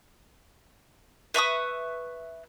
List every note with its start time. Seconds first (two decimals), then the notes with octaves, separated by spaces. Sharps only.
1.34 B4 E5 C#6 D#6